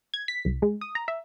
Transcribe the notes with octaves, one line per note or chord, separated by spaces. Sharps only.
G#6
B6
C2
G#3
D#6
A#5
E5